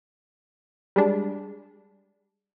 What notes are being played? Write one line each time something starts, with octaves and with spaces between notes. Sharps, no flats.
G3 G#3 D4